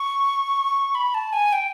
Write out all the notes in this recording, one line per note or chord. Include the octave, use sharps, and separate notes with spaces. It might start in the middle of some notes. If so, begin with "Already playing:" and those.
Already playing: C#6
B5
A5
G#5
G5